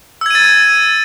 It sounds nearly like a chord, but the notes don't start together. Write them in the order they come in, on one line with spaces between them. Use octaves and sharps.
E6 G#6 D#7 A6